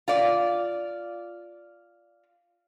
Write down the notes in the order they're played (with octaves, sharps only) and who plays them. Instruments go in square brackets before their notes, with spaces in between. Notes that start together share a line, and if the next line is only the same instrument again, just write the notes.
[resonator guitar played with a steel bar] F4 D5